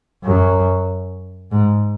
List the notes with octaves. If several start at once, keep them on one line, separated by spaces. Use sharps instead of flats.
F#2
G#2